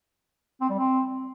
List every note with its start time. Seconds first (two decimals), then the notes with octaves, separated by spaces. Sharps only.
0.61 C4
0.69 G3
0.78 C4